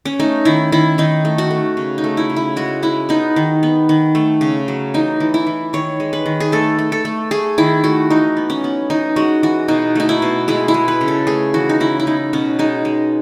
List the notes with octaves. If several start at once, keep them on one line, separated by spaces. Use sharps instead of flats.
C#4
A3 D#4
D#3 E4
D#3 E4
D#3 D#4
A3
F#4
A3
C#3
D#4
A3
E4
C#3
E4
G#3 F#4
G#3 E4
B3 D#4
D#3
B3
D#3
A3
C#3
F#3
E3 D#4
E3
E4
E3
D#3 C#5
G#3
B4
D#3
G#4
A3 A4
A3
A4
A3
A3 G#4
D#3 E4
A3 F#4
E3 D#4
B3
C#4
B3
E3 D#4
G#3 F#4
E3 F#4
B2 D#4
A3 D#4
E4
B2
G#3 E4
E4
G#3
B4
C#3
A4
A3 G#4
E3 F#4
D#4
C#3 E4
E4
B3 D#4
B2 C#4
G#3 D#4
G#3